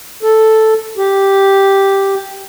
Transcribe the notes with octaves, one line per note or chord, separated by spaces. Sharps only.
A4
G4